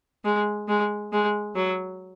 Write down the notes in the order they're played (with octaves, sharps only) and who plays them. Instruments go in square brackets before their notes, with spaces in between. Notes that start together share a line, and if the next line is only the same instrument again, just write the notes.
[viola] G#3
G#3
G#3
F#3